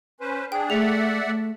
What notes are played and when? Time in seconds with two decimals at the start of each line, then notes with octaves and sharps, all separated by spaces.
0.20 C#4 B4 C5
0.52 D4 G#4 G5
0.70 A3 G#4 D5 E5 F#5
1.25 A3